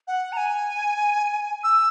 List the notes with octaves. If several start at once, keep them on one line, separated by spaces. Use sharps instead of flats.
F#5
A#5
G#5
E6